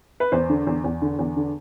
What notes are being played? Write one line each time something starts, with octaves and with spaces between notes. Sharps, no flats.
B4
E2 C5
D3
E2
E2
D3
E2
D3